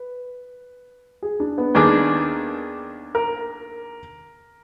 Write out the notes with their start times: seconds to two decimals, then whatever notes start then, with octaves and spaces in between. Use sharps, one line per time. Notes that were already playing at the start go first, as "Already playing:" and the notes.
Already playing: B4
1.22 G#4
1.40 D4
1.58 B3
1.74 D#2 D#3 A#3 D4 G#4
3.15 A#4